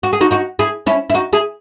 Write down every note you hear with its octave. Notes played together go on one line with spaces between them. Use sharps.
F#4
G#4
D#4 F#4
D#4 F#4
E4 G#4
C#4 E4
E4
D#4 F#4
E4 G#4